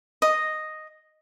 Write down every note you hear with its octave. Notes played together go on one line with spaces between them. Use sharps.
D#5